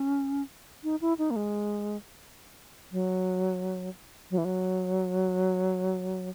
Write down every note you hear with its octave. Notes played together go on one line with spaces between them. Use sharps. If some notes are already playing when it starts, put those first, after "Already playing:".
Already playing: C#4
D#4
E4
D#4
A#3
G#3
F#3
F#3
E3
F#3